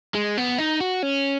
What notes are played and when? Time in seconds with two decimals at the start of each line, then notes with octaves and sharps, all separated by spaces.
0.15 G#3
0.38 B3
0.58 D#4
0.80 F#4
1.03 C#4